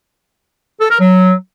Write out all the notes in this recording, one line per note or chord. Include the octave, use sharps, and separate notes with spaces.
A4
A#4
F#3